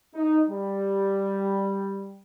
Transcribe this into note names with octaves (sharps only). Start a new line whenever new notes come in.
D#4
G3